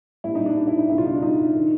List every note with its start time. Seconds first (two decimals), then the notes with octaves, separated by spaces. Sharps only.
0.24 A#1 A#2 G3 E4
0.35 D#4
0.46 D4
0.57 D4
0.67 E4
0.78 D#4
0.89 C#2 B2 G3 E4
0.98 F4
1.06 D#4
1.14 D4
1.22 D#4
1.55 D#3